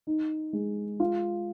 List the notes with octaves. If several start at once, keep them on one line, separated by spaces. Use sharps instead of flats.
D#4
G#3
F4